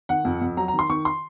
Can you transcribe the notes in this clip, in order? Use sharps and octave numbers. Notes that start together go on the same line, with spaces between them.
D#3 F#5
F2
F2
F#3 A#5
A#5
D#3
C6
D#3 C#6
C6